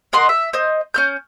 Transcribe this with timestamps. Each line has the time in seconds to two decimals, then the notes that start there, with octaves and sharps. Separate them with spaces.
0.13 A#4 D#5 F#5 C6
0.29 E5
0.53 C5 D#5
0.94 C#4 F6 G6